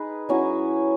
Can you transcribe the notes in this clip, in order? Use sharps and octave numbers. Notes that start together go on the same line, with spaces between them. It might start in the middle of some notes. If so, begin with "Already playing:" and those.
Already playing: D#4 G#4 B4
F#3 C#4 E4